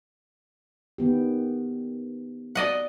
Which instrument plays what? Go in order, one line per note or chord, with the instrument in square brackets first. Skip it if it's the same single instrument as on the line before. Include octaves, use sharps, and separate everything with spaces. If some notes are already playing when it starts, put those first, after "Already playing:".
[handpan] D#3 B3 G4
[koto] D5 D#5 F#5